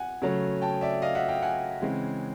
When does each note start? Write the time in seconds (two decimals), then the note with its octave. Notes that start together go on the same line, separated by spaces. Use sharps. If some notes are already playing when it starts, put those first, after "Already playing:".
Already playing: F#5 G#5
0.22 C#3 F#3 A3
0.62 G5 A5
0.81 D5 E5
1.02 D#5 F5
1.15 E5 F#5
1.28 F5 G5
1.42 F#5 G#5
1.82 C#3 E3 G#3 C4